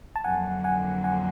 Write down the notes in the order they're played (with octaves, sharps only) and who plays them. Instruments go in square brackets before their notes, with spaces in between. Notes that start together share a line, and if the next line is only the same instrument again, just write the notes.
[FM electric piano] A5
[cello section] F2 D3 F#3 A#3 [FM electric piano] F#5 G#5
[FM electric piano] F#5 G#5
F#5 G#5